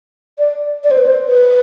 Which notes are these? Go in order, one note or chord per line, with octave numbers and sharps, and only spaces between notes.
D5
D5
C5
B4
C5
B4